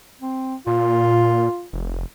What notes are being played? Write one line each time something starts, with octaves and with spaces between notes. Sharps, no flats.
C4
A#2 F4
F1